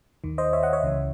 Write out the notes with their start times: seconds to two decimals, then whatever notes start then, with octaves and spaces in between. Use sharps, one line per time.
0.24 D#2 D#3
0.38 C5 D#5
0.53 C#5 E5
0.63 D#5 F#5
0.73 C#5 E5
0.83 C#2 C#3 E3